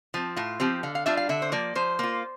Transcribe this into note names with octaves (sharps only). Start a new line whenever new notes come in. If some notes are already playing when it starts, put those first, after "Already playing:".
F3 C4
A2 F4
F3 C4 G4
D3 F5
F5
G3 D4 F4 E5
F5
D3 E5
C5
F3 A#3 D5
F3 C5
A#3 F4